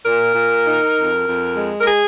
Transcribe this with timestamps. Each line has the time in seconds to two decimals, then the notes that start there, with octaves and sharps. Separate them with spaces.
0.05 A#2 A#4
0.35 A#2
0.65 D#4
0.96 F2
1.26 F2
1.57 G#3
1.81 A#4
1.88 G#4